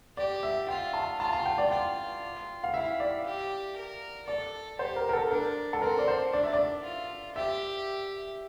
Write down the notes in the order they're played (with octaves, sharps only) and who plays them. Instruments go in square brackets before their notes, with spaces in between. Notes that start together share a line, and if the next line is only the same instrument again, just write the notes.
[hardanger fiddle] G4 [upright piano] D5
[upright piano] E5
[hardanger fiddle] F4 [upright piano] G5
[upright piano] A5
[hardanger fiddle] F4 [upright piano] A5
[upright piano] A5
G5
D5
[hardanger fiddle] F4 [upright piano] G5
[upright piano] F5
[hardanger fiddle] E4 [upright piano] E5
[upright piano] D5
[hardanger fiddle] G4
A#4
[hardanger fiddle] A4 [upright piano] D5
[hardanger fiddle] G4 [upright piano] C5
[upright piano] A#4
A#4
A4
[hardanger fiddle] D4 [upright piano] A#4
[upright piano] A4
[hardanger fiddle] C4 [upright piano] A#4
[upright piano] D5
C5
[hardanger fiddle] D4 [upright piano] D5
[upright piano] E5
D5
[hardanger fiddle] F4
[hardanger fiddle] G4 [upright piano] E5